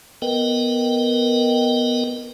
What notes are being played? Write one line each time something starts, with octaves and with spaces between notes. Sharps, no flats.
B3 A#4 B4 D#5 G5